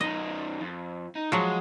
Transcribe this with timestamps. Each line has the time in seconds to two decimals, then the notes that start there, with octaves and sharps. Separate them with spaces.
0.01 F#2 D#4 D#5
0.61 F2
1.15 D#4
1.32 F3 F#3 G#3